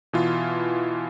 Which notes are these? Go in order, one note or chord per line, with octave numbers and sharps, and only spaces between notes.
B2 E3 F4